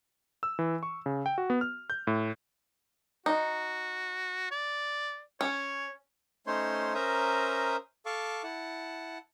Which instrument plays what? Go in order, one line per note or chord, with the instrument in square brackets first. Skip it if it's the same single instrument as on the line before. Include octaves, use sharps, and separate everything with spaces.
[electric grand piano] E6
E3
C#6
C#3
G5
F#4
B3
F6
G6
A2
[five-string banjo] D#4 [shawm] F#4
[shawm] D5
[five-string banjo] C#4 [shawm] C#5
[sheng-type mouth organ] A3 C#4 D#4 C5 C#5 C6
C#4 A#4 C5 E5 A#5 D#6
A4 F5 A5 C#6 D6
E4 F#5 A5